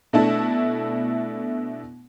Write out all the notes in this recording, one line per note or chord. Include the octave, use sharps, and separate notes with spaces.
B2 A3 D4 E4 A5